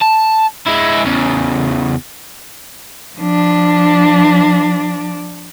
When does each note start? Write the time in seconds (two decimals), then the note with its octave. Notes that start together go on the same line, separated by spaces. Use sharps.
0.01 A5
0.66 G#3 E4
1.05 E2 C#3
3.17 F3 D4